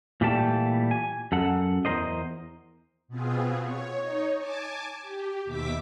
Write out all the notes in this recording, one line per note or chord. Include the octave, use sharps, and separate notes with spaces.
A#2 E3 G3 A3 G4 A5
G#5
F#2 A4 F#5
E2 D#3 A#4 C5 D#5
B2 B3 C4 F4 G#4
C#5
D#4 C#5
G#5 A5 D6
G4
D#2 B2 E5 D6 B6